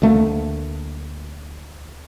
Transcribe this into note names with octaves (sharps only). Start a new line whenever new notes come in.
D2 A3 A#3